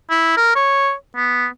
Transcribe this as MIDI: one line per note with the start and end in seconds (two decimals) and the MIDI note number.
0.10 0.35 64
0.37 0.52 70
0.56 0.93 73
1.16 1.47 59